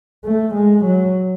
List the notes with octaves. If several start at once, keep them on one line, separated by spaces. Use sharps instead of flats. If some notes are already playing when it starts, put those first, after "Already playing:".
A3
G#3
F#3